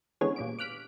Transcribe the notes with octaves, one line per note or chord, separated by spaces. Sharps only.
D3 E3 G#3 B3 C#4 C#5
A#2 G3 D7
D6 F6 F#6 B6 D7